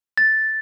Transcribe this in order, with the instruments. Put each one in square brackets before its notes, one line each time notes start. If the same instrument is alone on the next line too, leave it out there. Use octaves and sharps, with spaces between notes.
[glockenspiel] A6